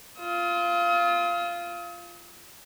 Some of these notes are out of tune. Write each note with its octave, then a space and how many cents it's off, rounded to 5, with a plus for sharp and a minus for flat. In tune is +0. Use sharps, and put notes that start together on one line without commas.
F4 -10 D#6 +40